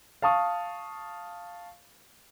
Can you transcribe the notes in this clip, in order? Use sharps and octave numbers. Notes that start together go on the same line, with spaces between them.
F5 A5 C#6 D#6